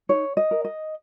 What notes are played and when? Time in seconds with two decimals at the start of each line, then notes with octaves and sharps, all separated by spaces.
0.09 D#4 C#5
0.37 D#5
0.51 A#4
0.65 D#5